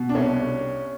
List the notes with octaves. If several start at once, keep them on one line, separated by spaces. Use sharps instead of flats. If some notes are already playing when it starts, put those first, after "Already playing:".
Already playing: B2
D4
C2 C#4